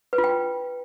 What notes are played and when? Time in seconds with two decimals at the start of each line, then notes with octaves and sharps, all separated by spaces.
0.13 B4
0.18 F4
0.24 G5
0.29 F4